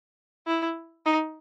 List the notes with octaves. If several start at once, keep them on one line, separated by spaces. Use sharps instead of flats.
E4
D#4